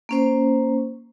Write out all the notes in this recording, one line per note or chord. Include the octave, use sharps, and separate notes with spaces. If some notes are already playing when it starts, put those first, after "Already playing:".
A#3 C#4 C5